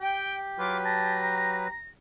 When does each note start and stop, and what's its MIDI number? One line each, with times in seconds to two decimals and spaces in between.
0.01 1.70 67
0.01 0.37 79
0.59 1.68 54
0.59 0.79 65
0.59 1.68 71
0.59 0.78 86
0.85 1.18 81
0.85 1.88 94
1.23 1.75 82